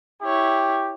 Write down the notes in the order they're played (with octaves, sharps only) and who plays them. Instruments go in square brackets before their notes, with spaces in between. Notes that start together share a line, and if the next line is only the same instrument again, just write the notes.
[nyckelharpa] E4 C#5 [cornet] G4